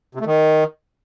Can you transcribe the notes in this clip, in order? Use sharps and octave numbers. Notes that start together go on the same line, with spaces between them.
C3
A3
D#3